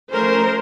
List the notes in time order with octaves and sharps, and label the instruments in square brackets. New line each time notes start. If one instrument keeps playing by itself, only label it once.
[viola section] F3 A3 C#4 A#4 C5